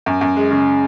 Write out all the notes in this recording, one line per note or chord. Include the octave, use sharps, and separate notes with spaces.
F#2
F#2
G#3
C#3